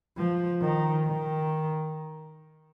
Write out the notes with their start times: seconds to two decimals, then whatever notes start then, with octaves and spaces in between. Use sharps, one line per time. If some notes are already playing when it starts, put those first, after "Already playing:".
0.18 F3
0.62 D#3
1.06 D#3